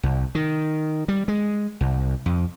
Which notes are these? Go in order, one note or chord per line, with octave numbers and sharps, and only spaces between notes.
C2
D#3
G3
G#3
C2
F2